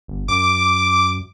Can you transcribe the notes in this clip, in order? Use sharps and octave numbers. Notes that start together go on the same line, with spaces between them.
G1
F#2 D6